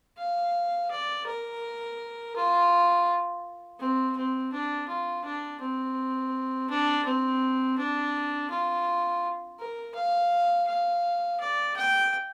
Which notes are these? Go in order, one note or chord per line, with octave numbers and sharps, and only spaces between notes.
F5
D5
A#4
F4
C4
C4
D4
F4
D4
C4
D4
C4
D4
F4
A#4
F5
F5
D5
G5